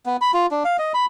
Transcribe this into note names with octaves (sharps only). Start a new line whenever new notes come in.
B3
B5
F4
D4
F5
D#5
B5